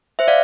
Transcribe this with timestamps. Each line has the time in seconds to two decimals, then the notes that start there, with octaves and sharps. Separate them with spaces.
0.19 C5 E5
0.28 D5 F5